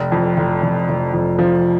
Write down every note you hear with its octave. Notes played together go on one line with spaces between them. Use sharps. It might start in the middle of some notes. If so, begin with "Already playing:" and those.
Already playing: F1
F2
F1
F1
F1
F2
F3